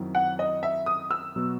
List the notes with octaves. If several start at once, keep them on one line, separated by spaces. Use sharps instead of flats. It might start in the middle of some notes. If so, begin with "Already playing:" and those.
Already playing: F#2 D#3 F#3 C4 E4
F#5
D#5
E5
D#6
E6
B2 F#3 B3 F#4